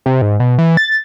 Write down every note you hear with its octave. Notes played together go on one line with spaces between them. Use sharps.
C3
G#2
B2
E3
A6